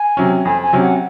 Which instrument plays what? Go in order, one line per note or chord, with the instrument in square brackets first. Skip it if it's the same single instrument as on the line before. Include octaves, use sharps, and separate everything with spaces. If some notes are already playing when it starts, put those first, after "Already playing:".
Already playing: [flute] G#5
[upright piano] C3 F#3 C#4
[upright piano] F2 [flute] G#5
[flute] G#5
[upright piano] C3 F#3 C#4
[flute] F#5